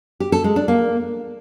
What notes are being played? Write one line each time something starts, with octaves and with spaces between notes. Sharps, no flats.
G4
A4
G#3
D4
A#3